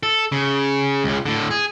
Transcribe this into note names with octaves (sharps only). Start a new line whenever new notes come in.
A4
C#3
C#2 C#3
A2 D3
G#4